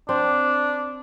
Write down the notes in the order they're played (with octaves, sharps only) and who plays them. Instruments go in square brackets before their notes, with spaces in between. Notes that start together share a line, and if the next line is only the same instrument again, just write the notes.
[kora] C4 [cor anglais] D4